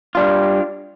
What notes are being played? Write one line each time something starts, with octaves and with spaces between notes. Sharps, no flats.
G3 D4 F4